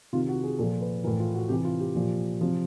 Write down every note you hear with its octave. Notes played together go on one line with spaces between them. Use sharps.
C3 D#3 F4
F#4
G#4
A#2 F3 A4
B4
A2 E3 A#4
F4
F#4
C3 E3 G4
F4
G4
A#2 F3
C3 F3